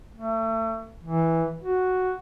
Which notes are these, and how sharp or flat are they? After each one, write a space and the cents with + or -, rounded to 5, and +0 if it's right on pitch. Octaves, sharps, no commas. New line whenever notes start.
A3 +30
E3 -5
F#4 +0